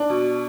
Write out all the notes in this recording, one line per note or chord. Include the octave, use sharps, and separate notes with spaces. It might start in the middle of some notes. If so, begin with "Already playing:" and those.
Already playing: D4
B2